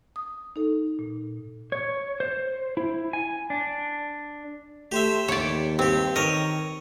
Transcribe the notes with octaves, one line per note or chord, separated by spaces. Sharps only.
D#6
D#4 A4
A#2
C#5
C5
E4
G#5
D4
A3 G4 C5 E5
D#2 C#5 D5
G2 C4 G4
D#3 A#4 C#5 D#5